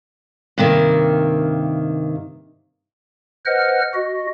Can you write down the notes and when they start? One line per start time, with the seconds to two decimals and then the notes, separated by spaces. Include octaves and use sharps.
0.58 G2 C3 D#3 A#3
3.46 B4 C5 D#5 F#5 F6
3.94 F#4 D#5